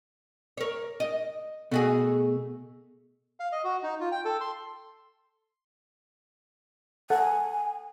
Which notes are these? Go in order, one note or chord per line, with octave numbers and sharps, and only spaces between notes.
A#4 C#5
D#5
B2 A3 F#4 G#4
F5
D#5
F#4
D#4
F4
G5
A4
C6
A4 F#5 G#5